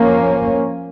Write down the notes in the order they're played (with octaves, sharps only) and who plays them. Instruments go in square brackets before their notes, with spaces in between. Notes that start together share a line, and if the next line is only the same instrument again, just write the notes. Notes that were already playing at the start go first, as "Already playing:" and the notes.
Already playing: [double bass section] F3 A#3 C#4